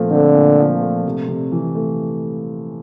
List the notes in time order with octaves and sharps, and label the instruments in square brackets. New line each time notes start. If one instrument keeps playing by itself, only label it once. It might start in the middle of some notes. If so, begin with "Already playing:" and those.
Already playing: [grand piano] A#2 F3 A3 C4
[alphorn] D3 [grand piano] C4
[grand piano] A#2
F3
A3
C3
C3
E3
A3